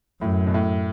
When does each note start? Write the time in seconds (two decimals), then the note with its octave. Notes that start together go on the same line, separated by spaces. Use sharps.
0.21 F#2 A2
0.47 B2
0.54 A2